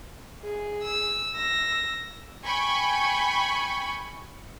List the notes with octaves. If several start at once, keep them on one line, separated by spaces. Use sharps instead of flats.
G#4
E6
E6 A#6
G5 G#5 B5 C#6